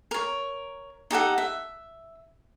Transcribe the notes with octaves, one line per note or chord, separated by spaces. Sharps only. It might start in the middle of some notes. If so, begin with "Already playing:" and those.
A#4 C#5
D#4 G4 A4 F#5
E5